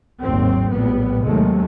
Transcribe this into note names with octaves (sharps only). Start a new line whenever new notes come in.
G#1 D#2 F#3 C4
A#1 A2 G3 B3
D#2 C3 F#3 G#3 A3